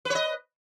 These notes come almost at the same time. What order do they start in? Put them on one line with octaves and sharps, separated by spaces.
B4 C#5 D#5